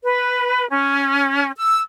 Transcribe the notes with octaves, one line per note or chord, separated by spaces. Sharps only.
B4
C#4
E6